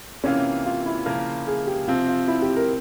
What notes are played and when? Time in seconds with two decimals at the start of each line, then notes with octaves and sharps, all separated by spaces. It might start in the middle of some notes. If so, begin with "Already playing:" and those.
0.24 C3 E3 A#3 C#4 F4
0.66 F4
0.86 E4
1.06 C#3 F3 A#3 F4 A#4
1.47 G#4
1.67 G4
1.88 C3 F3 C4 F4
2.08 F4
2.28 E4
2.42 G4
2.56 A#4